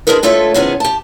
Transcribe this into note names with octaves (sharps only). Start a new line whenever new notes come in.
G#3 A#3 D4 G#4 A#4 B4
G#3 A3 F4 A4 C#5 E5
C3 D#3 F3 B3 C#4 G#4
G4 A5